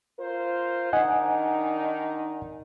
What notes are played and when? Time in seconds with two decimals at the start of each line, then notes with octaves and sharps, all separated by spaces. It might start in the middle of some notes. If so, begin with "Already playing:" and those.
0.20 F4 A#4 C5
0.93 D#3 D4 D#4 D#5 F#5 G#5